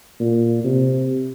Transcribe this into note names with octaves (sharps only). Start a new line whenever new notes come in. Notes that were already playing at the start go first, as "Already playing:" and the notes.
A#2
C3